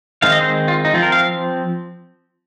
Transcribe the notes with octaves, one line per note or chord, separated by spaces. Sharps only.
D#3 G#3 C4 F5
D#5
C5
F4
D#4
F3 C4 F4
A#4
F5